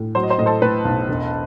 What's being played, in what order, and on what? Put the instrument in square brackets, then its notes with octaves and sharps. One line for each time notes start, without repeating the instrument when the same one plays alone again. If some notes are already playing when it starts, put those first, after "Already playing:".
Already playing: [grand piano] A2
[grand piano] F#3 [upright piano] C5
[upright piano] D#5
C5
[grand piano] A2 [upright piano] D#5
[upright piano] A4 C5
[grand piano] A2 [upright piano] B4
[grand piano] B1
E1